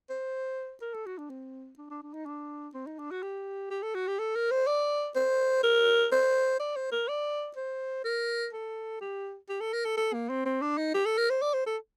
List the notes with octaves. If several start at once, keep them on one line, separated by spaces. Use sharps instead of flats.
C5
A#4
A4
F#4
D4
C4
D4
D4
D4
D#4
D4
C4
D#4
D4
F#4
G4
G4
A4
F#4
G4
A4
A#4
C5
D5
C5
A#4
C5
D5
C5
A#4
D5
C5
A#4
A4
G4
G4
A4
A#4
A4
A4
A#3
C4
C4
D4
D#4
G4
A4
A#4
C5
D5
C5
A4